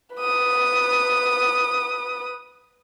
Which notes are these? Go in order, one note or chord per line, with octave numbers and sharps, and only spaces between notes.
B4 D#6